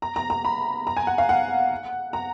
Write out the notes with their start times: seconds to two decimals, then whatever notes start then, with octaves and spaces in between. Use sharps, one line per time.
0.02 A#5
0.16 A#5
0.30 A#5
0.45 B5
0.87 A#5
0.97 G#5
1.07 F#5
1.18 F5
1.29 F#5
2.13 A#5